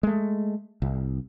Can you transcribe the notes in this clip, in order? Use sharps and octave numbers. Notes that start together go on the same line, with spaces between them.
G#3 A3
C2